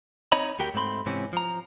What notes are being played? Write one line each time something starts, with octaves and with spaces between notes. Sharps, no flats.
C4 D#4 C#5 D#5 A#5 B5
D2 F#4 G4 A#4 G5
G#2 A3 C4 B5 C6
G#2 C3 E3 C4 C#4
F3 A#5